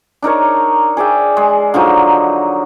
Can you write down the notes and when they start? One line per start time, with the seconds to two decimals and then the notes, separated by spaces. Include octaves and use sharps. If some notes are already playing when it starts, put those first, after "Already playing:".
0.22 D4 D#4 A#4 C#5
0.97 G#4 D5 E5 G5
1.37 G#3
1.74 D3 F3 F#3 D#4